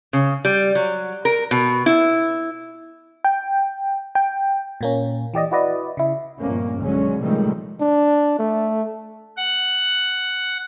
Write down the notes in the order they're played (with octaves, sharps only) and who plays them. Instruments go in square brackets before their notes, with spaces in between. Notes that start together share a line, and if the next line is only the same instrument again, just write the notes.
[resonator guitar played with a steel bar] C#3
G3
F#3
A#4
B2
E4
[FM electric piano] G5
G5
A#2 A#3 C#4
E3 G4 D5 D#5
E4 F#4 B4 D5 D#5
C#3 E4
[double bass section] G1 F2 A#2 A#3 C#4
B1 D3 F#3 G#3 C#4
A2 C3 D#3 F3 G3 G#3
[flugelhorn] D4
A3
[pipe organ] F#5